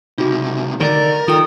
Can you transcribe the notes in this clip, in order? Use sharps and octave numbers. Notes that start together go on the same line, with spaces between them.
C#2 C3 D#4 F#4
D3 D#3 A#4 D5
D#3 F4 A4 G5 D#6